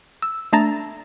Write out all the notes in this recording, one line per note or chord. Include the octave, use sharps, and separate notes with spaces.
E6
A3 D4 A5 A#5 A6 A#6